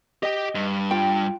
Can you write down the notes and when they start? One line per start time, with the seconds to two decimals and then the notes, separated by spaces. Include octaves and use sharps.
0.23 G4 D#5 G5
0.55 G2
0.91 F4 G5